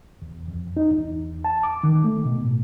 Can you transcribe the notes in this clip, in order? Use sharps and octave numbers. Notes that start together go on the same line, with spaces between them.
E2
F2
D#4
E2
A5
D6
D#3
A3
B2
A2